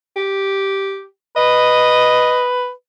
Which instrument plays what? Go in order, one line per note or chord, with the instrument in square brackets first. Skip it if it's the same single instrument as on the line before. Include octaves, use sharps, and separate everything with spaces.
[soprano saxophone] G4
[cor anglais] B4 [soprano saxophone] D#5